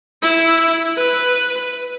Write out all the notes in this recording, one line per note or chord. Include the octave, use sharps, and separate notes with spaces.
E4
B4